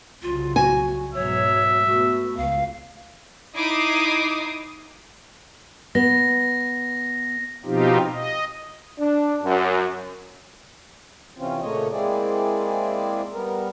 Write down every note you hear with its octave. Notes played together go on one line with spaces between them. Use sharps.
C2 C#3 F#3 F4
F#4 G#5
G#2 B2 F#3 C#5 E5
A3 B3 F#4
C#2 F5
D#4 E4 D6 D#6 C7
B3 A#6
B2 F3 C4 D#4 F4 G4
D#5
D4
F#2
C3 E3 C4 C#4 F4
A#2 C#3 A3 A#3 C#5 D#5
G#3 A#3 C4 E4 G#4 D5
G3 B3 A#4